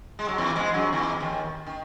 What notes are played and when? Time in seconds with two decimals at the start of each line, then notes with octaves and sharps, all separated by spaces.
0.19 G#3
0.28 F#3
0.38 E2 E3
0.56 G#2 G#3
0.74 F#2 F#3
0.93 E2 E3
1.20 D#2 D#3
1.67 D#3